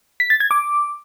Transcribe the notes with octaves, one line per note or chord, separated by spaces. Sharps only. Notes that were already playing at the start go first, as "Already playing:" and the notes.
B6
A6
G#6
D6